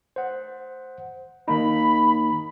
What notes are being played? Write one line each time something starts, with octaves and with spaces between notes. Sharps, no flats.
C5 F#5
D#3 A#3 D#4 B5